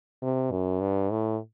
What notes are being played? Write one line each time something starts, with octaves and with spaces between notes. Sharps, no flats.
C3
F#2
G2
A2